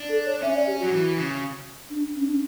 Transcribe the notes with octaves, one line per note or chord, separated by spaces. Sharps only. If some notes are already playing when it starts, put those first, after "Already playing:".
Already playing: D4
A4
C#5
C#4 E5
D5
G4
F#3 F#4
E3
C#3
D4
C#4
D4
C#4